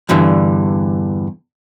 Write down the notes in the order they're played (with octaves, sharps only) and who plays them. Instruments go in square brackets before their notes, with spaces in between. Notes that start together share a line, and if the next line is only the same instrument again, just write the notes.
[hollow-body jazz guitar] E2 G2 D3 E3